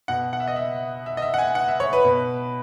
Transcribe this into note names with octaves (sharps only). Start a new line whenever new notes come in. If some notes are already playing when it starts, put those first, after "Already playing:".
B2 F#5
F#5
E5
D#5
E5
E5
D#5
E5
F#5
G#5
F#5
E5
C#5
B4
B2